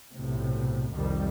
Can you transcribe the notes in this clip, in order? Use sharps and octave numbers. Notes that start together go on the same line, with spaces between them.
B1 A2 C3
C2 F2 D#3 G3